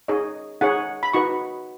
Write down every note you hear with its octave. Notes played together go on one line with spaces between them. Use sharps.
D#4 G#4 C#5 D#5
D#4 G#4 C#5 F#5
B5
D#4 F#4 B4 C#6